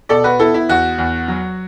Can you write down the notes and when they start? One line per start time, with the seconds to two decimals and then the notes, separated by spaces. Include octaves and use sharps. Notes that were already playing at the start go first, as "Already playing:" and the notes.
0.09 B2 A4 D5
0.24 F#4 B4
0.39 B3 E4 A4
0.54 E4
0.69 E2 F#4
0.98 E2
1.28 F#3